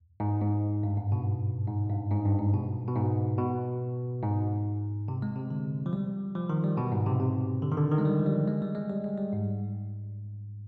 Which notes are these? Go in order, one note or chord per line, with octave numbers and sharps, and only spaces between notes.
G#2
G#2
G2
G#2
B2
G#2
G2
G#2
G2
G#2
B2
B2
G#2
B2
G#2
C3
G#3
C3
D3
F3
G3
F3
D#3
G3
B2
G#2
C3
C3
D3
D#3
D3
D#3
G#3
G3
F3
G3
G#3
G3
G#3
G3
G#3
G3
G#2